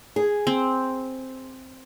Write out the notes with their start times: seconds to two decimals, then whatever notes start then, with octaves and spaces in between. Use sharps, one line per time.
0.16 G#4
0.47 C4